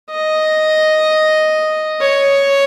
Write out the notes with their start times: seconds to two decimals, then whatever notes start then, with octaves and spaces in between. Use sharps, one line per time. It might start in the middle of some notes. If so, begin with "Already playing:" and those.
0.11 D#5
2.01 C#5